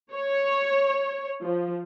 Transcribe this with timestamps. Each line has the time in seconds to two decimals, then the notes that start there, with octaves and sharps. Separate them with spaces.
0.12 C#5
1.43 F3